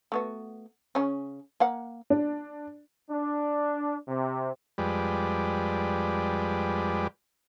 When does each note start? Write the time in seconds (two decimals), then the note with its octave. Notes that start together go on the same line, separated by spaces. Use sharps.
0.12 A3 B3 F#4
0.95 C#3 C#4
1.60 A#3 F5 F#5
2.10 D4
3.10 D4
4.08 C3
4.78 F2 G3 G#3 B4 D5